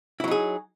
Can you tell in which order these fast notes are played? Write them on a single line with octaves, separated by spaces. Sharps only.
E4 F#3 D#4 G#4